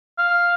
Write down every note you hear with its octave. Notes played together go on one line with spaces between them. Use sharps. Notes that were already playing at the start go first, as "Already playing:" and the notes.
F5